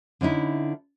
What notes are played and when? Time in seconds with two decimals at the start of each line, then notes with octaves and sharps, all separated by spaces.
0.21 D3 C#4 D#4 E4